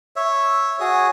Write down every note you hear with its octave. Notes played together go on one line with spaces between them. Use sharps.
C#5 E5
F#4 G#4 C#5 D#6